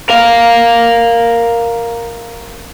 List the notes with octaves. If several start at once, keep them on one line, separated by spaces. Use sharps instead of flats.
A#4 F5